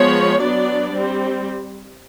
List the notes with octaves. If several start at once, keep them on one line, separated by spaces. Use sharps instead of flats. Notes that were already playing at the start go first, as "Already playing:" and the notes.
Already playing: F3 G#3 B3 C#5
F#3 B3 D4 D5
G3 C4